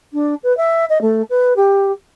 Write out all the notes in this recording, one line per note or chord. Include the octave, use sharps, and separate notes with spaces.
D4
B4
E5
D#5
A3
B4
G4